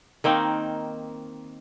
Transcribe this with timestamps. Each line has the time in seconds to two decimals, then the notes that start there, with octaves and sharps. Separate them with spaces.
0.24 D#3 A#3 C4 D#4